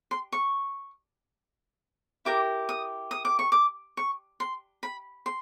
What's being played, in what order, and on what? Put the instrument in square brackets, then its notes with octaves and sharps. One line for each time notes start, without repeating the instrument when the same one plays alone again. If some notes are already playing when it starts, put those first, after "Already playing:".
[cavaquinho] C6
C#6
E4 G4 A#4 D6
D#6
D#6
D6
C#6
D6
C#6
C6
B5
C6